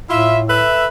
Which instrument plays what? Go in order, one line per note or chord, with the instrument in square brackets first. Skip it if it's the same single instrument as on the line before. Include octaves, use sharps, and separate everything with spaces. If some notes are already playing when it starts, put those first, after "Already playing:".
[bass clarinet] A2 [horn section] E4 F4 E5
[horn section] A4 B4 E5